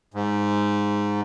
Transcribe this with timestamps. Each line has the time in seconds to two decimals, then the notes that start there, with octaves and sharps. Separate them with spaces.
0.14 G#2